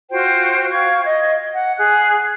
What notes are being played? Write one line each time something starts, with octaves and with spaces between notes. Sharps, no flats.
F4 F#4 C5 G5
F5 C#6 G#6
D#5
F#5
G#4 F#6